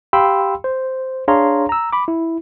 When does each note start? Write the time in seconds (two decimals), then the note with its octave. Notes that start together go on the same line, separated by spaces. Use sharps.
0.13 G4 F5 G5 B5 C6 E6
0.64 C5
1.28 D4 G#4 C#5 F5 A#5 C6
1.69 A#5 E6
1.93 B5 D6
2.08 E4